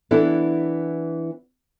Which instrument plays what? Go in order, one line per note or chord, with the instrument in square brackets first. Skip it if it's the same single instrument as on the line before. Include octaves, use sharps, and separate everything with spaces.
[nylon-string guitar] E3 B3 D4 E4 A4